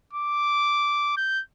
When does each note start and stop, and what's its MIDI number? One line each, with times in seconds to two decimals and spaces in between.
0.13 1.13 86
1.17 1.41 91